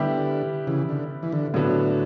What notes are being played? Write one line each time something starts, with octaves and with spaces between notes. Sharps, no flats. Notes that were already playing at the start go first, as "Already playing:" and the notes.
Already playing: D3 G3 B3 E4 G4
C#3 E3
D3
E3
D3
A2 D3 F#3 B3